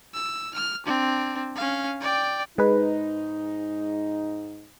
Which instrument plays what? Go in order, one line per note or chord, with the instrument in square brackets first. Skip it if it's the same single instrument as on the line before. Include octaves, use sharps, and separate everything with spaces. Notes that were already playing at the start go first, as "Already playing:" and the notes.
[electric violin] E6
F6
C4 D4
C#4 F5
D5 G5
[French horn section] G#2 D#4 [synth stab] G#3 B4